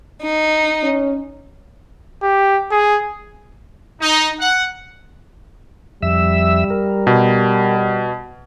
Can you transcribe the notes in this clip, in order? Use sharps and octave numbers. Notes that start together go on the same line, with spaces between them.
D#4
C#4
G4
G#4
D#4
F#5
F2 G3 E5 E6
A#4
B2